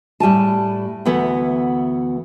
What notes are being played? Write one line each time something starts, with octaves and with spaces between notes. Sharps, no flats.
A2 G3 G#5 A5
D2 E3 B3 F#5